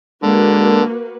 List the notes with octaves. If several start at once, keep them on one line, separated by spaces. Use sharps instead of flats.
D3 G#3 A#3 F#4 B4